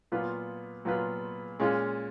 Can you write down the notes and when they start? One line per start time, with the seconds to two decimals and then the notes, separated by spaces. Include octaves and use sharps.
0.12 A#2 F#3 B3 F4 B4
0.85 A#2 F#3 B3 F4 B4
1.60 A#2 G#3 C#4 F4